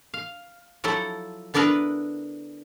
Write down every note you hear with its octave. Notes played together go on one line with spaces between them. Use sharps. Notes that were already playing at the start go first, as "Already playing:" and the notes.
F5
F3 F#3 E4 A4
D3 B3 D4 E4 A#4 B4